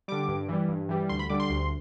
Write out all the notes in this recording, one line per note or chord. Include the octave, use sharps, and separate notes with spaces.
D3 G3 D6
G2
E3 G3
G2
E3 G3
D2 C6
B5
D3 G3 D6
C6
D2